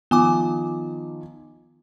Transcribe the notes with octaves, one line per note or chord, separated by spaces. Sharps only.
D#3 F3 B3 G#5 D6